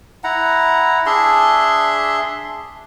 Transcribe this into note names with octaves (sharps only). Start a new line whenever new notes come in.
E4 F#5 A#5
D4 G#4 E5 C6